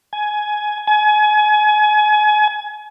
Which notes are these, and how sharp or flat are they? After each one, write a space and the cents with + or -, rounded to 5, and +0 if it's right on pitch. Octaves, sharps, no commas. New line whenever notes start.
G#5 +15
G#5 +30